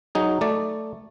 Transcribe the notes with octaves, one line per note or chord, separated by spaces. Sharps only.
F#3 D#4 G#4
A3 D5